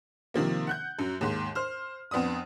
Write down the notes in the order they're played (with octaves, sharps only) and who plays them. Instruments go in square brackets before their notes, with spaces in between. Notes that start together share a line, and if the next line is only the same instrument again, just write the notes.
[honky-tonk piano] C3 D#3 F3 A#3
F#5 F#6 G6
F#2 F#3
D#2 G#2
C5 F6
F2 B3 D4 D#6